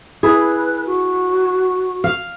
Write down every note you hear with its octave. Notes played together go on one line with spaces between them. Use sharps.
E4 G#4 B4
F#4
F5